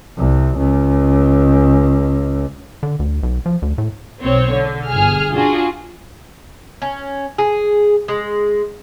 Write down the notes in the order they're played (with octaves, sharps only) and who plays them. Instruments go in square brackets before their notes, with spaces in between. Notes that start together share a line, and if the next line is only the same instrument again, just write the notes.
[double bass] C2
C#2
[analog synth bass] D3
D2
B1
F3
D2
A2
[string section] B1 C4 C#5
D3
G1 G#4 F6
D4 F4 F#4 G#4
[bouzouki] C#4
G#4
G#3